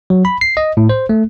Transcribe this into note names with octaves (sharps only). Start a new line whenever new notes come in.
F#3
B5
C7
D#5
A2
C5
A3